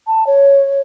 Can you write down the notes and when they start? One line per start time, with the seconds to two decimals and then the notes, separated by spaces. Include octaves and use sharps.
0.07 A5
0.27 C#5